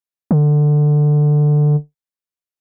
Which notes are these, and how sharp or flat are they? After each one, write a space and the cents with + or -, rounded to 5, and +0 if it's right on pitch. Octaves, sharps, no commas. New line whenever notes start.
D3 +15